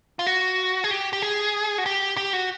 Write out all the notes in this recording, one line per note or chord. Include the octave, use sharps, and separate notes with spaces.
F4
F#4
G#4
G4
G4
G#4
F#4
G4
G4
F#4